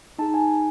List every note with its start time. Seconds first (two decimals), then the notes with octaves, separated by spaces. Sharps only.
0.19 D#4 G#4 A5
0.34 G#5
0.49 G#5